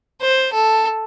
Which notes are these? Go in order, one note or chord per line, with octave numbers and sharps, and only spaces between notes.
C5
A4